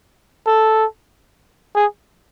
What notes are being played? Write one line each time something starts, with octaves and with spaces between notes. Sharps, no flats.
A4
G#4